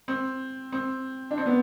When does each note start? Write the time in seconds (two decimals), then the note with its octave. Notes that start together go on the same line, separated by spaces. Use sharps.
0.08 C4
0.72 C4
1.31 D4
1.38 C4
1.46 B3